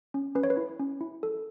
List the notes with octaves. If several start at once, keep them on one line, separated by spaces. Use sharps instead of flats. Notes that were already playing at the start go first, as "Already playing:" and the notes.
C#4
C#4 B4
C#5
B4
E4
C#4
E4
A4